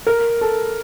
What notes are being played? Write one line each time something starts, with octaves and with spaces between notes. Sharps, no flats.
A#4
A4